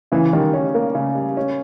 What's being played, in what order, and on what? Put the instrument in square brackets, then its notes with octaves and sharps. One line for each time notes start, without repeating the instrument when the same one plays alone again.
[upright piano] C#3 [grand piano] E3
[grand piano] D#3 [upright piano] G3
[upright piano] C#4
A#3
C#3
G3
C#4